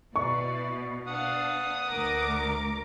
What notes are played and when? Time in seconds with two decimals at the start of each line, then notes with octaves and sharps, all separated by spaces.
0.16 B2 E4 B4 D5 C#6
1.07 D4 F5 F#5 D#6
1.90 D2 A#4 D6